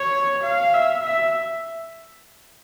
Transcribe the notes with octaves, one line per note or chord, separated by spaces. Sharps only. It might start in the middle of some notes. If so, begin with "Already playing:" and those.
Already playing: C#5
F5
E5
E5